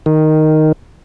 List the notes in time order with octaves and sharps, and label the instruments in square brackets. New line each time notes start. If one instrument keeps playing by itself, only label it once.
[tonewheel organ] D#3